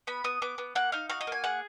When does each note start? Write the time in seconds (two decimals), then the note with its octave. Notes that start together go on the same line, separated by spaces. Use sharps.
0.07 B3 B5
0.24 B3 D#6
0.42 B3 D6
0.58 B3
0.75 A#3 F#5
0.92 D#4 F5
1.09 F#4 F5
1.21 D#5
1.27 A#3 G#5
1.44 G#4 F#5